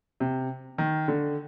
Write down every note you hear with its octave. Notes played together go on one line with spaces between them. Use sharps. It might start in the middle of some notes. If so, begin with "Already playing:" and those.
C3
D#3
D3